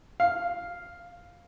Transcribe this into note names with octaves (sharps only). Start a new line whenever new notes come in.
F5